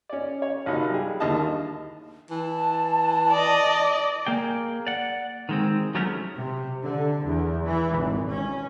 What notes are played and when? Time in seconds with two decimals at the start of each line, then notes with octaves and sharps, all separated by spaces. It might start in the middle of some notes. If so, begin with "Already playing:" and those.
0.09 C#4 D5
0.42 C#5
0.66 A#1 C3 D#4 F#4
0.90 G3 G#4
1.20 A1 D#2 D3 A#3 D#5 A5
2.30 E3 A5
3.31 D5 D#5
4.27 A#3 G#4 G5
4.87 D5 F#5
5.49 D#3 G#3 C4
5.95 F#3 G#3 A3 B3 C#4 A#4
6.34 C3
6.81 D3
7.24 E2
7.65 E3
7.96 G#1
8.29 C#4